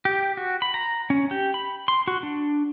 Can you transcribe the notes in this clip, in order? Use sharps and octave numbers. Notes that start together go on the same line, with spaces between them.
G4
F#4
B5
A#5
C#4
G4
B5
C6
F#4
D4